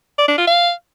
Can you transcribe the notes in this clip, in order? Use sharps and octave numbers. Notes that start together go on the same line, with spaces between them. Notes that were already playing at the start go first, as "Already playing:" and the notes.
D5
D4
F4
F5